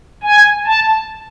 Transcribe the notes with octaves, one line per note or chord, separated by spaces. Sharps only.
G#5
A5